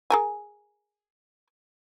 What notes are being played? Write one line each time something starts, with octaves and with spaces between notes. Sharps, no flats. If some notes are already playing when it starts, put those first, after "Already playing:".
G#4 A#4 G#5